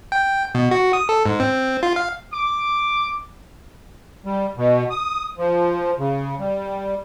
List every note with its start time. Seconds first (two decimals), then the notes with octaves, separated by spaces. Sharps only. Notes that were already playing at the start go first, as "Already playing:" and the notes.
0.12 G5
0.55 B2
0.71 F#4
0.93 D#6
1.09 A4
1.26 G#2
1.40 C4
1.83 F4
1.96 F5
2.33 D6
4.25 G3
4.57 B2
4.90 D#6
5.38 F3
5.99 C#3
6.40 G3